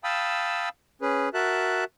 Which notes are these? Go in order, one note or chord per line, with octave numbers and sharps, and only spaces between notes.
F5 G5 A5 B5 D#6 E6
C#4 G#4 B4
F#4 A#4 E5 A5 F#6